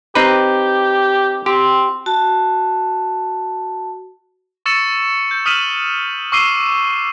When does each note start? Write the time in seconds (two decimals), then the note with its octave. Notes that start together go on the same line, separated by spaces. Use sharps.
0.15 C4 D#4 G4 B4
1.46 C4 G4
2.06 F#4 A5
4.66 C#6 E6 A6 C#7 E7
5.31 G6
5.46 D#6 F6 B6 D#7 E7 F#7
6.32 C#6 D6 E6 C7 D#7 G7